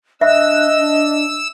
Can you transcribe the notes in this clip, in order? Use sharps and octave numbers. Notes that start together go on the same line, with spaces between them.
D4 D#5 E5 E6 F#6
D4